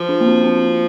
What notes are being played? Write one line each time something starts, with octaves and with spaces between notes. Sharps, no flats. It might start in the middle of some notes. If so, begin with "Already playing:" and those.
Already playing: F3 F4
D4
A#3
C4
C4